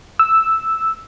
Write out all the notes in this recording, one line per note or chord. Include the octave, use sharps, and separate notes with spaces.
E6